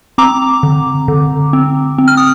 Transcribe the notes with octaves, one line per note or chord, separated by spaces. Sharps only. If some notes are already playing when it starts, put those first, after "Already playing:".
C4 A#5 D6
D3
D3
C4
C4
F6
D#6